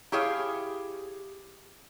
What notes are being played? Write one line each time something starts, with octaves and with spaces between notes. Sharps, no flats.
E4 G4 G#4 C#5 F5